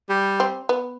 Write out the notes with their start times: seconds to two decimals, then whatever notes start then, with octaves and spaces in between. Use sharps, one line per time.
0.09 G3
0.40 C4
0.69 B3